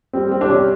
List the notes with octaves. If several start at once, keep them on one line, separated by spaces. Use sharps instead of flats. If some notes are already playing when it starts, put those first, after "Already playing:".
G3 C4
G3 C4
D4
C3 C#4